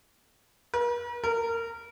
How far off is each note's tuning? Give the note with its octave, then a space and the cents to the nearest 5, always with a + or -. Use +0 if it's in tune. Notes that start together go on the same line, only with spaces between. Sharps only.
A#4 +45
A#4 -25